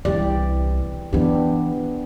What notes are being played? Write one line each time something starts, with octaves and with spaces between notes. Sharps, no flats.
C2 E3 G4 D5
C#3 E3 B3 D4 G4